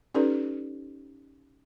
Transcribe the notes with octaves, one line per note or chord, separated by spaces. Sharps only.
C#4 D#4 G4 A4 B4 D5